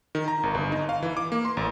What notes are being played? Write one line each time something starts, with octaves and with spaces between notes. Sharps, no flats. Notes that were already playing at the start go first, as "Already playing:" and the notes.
D#3
A#5
G#1
G1
D#4
F5
E3
D6
A#3
C6
A1